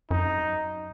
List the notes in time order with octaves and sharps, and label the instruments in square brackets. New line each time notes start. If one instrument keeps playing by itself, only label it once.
[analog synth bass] F#2 [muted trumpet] D#4